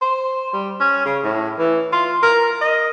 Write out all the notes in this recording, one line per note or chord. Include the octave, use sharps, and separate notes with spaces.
C5
G3
C#4
C#3
A2
E3
F4
A#4
D#5